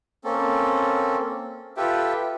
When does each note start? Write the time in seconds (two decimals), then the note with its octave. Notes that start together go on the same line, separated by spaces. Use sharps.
0.24 A#3 C4 C#4 A4
1.77 F4 G4 A4 B4 E5 G5